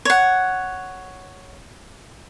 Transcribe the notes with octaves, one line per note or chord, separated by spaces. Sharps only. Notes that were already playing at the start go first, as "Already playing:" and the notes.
C#5 F#5